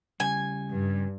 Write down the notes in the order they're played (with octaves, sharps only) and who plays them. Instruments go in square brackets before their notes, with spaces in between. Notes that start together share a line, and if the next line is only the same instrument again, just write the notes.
[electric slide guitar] C#3 G3 [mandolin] G#5
[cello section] G2